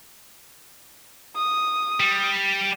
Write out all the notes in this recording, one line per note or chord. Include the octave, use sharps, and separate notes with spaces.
D#6
G3